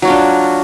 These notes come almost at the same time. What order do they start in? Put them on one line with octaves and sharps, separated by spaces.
F#3 F#4 F4 D4